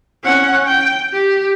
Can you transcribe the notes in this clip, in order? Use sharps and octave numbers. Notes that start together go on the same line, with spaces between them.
C#4 F#5
G5
G4